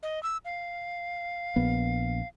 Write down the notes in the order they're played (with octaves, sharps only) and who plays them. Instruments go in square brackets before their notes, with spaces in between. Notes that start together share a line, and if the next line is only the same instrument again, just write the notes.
[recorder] D#5
E6
F5
[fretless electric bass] A#1 B3